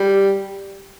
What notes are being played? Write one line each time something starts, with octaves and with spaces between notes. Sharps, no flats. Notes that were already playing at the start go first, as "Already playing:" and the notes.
Already playing: G3